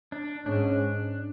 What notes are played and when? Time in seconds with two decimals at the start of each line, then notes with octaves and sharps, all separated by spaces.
0.12 D4
0.46 G#2 G#3 C#4 D4